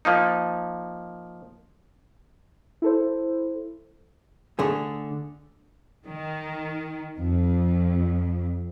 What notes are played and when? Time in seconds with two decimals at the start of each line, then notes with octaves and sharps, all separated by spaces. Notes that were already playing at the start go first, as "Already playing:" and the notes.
0.05 F3 A#3 D#4
2.82 E4 A4 C5
4.59 D3 A3 G#4
6.05 D#3
7.17 F2